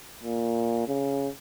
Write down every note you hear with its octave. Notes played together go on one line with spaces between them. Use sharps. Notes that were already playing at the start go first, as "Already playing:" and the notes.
A#2
C#3